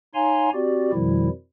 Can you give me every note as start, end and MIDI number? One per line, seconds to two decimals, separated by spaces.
0.14 0.50 63
0.14 0.50 73
0.14 0.50 77
0.14 0.50 80
0.14 0.50 82
0.14 0.50 84
0.54 0.91 60
0.54 0.91 66
0.54 0.91 67
0.54 0.91 74
0.93 1.28 41
0.93 1.28 47
0.93 1.28 51
0.93 1.28 53
0.93 1.28 55
0.93 1.28 64